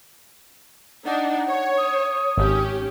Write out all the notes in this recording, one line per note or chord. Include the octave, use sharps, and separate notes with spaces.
D4 D#4 F#5
C#5
D#6
G#1 C#4 G4